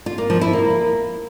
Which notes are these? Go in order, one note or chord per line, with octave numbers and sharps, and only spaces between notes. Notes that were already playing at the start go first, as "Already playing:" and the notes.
F4
A#3
F3
E4
A#3